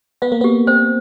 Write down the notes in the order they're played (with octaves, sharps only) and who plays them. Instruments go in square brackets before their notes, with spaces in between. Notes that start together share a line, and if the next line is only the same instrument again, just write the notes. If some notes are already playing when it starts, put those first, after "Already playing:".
[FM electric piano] B3 [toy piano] F5
[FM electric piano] A#3
[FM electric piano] B3 [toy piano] G4
[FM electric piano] C4 [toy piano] C5